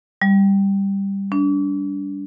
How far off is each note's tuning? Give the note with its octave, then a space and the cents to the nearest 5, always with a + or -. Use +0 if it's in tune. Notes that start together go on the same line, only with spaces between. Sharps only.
G3 +10
D4 -30